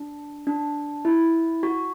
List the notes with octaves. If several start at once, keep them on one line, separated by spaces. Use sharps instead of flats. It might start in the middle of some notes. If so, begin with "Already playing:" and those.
Already playing: D4
D4
E4
F#4